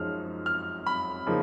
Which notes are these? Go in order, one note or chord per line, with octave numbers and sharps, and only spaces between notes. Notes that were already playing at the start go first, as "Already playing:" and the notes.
Already playing: F#2 F3 G#3 D#4 F6
F6
B5
C#3 F3 A#3 D#4